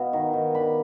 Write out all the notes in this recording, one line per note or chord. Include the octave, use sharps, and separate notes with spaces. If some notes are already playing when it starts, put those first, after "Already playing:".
Already playing: B2 B3 F5
D#3
D#3
D4 B5